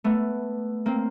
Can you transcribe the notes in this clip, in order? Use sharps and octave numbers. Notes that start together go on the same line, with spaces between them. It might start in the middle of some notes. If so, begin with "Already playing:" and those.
A3 B3
A#3 C4